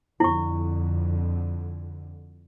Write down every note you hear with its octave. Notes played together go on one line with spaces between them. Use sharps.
F2 D3 E4 C#6